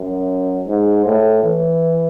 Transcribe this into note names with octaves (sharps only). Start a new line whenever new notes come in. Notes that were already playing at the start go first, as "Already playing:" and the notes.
Already playing: F#2
G#2
A2
E3